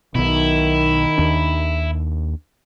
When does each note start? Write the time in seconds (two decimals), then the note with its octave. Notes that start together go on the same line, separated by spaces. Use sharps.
0.15 B1 B2 D#3 E4
1.18 D#2 D4